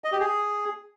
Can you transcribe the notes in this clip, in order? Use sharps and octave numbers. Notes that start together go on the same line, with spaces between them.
D#5
G4
G#4